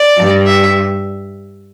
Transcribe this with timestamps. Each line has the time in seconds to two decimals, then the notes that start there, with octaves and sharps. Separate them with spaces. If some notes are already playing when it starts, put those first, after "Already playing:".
Already playing: D5
0.17 G2
0.46 E5